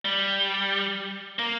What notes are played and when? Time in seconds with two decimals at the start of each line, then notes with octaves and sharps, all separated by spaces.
0.05 G3
1.39 A#3